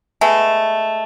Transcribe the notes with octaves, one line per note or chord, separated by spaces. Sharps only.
G#3 A3 B3